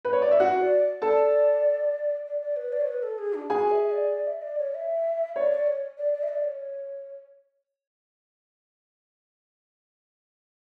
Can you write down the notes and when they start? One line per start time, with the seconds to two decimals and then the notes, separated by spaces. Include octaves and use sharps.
0.05 B4
0.13 C#5
0.22 D5
0.31 E5
0.40 E4 F#4 F#5
0.61 D5
1.02 A4 D5 A5
2.26 D5
2.41 D5
2.57 B4
2.73 D5
2.81 C#5
2.88 B4
3.03 A4
3.18 G#4
3.34 D4
3.50 F#4 G#4 G#5
3.71 E5
3.91 D5
4.12 D5
4.27 E5
4.42 D5
4.58 C#5
4.74 E5
5.36 C#5 D5
5.51 D5
5.67 C#5
5.98 D5
6.13 D5
6.23 E5
6.29 D5
6.44 C#5